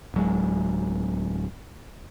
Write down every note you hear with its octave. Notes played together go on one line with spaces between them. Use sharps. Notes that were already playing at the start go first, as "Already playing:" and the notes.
D1 F#3 G#3